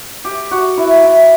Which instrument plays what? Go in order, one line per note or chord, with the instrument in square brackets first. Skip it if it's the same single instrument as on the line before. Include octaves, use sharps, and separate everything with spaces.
[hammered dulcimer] G4
F#4
E4
E4